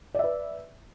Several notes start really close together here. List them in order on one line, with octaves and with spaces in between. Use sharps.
D5 E5 B4